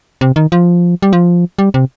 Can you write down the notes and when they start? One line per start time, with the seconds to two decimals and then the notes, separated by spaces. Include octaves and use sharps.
0.21 C3
0.36 D#3
0.52 F3
1.02 G3
1.13 F3
1.58 G3
1.74 C3